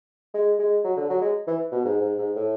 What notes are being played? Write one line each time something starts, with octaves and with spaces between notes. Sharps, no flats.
G#3
G#3
F#3
D3
F#3
G#3
E3
B2
G#2
G#2
G#2
A2